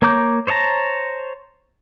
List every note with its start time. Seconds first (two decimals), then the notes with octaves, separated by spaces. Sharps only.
0.02 A#3 C#5 A#5 D6 G6
0.47 C5 C#5 D#5 A5 A#5